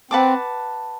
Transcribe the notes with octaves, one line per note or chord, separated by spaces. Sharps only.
C4 B4 F#5 A5 D6